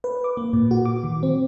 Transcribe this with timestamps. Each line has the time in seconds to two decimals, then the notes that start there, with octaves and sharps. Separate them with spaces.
0.04 B4
0.24 D6
0.37 A#3
0.53 A#2
0.71 F#4
0.85 D6
1.03 D#3
1.23 C4